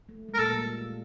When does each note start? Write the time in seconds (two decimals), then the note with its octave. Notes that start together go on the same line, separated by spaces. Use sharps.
0.09 A3
0.29 G#3
0.34 A#4
0.38 A#2 A#3 A4
0.53 G3